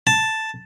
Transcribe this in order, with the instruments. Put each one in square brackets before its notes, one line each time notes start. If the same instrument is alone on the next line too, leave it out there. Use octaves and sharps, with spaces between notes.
[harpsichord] A5